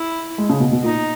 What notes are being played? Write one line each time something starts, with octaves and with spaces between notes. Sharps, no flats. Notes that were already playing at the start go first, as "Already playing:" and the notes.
Already playing: E4
G#3
C#3
B2
B2
A#2 D#4